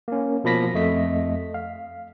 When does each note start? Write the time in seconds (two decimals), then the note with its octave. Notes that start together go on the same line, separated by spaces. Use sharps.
0.08 A#3 C#4
0.44 B2 F3 A#3 B5 A#6 B6
0.74 F2 A3 D#5 B6
1.54 F5